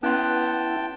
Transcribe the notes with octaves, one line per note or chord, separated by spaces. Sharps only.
B3 C#4 E4 G5 A5 C6